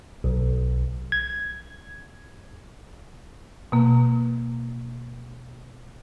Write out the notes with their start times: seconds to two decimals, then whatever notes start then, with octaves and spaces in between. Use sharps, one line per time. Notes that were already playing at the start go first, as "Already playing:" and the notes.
0.24 B1
1.12 G#6
3.72 B2 A#3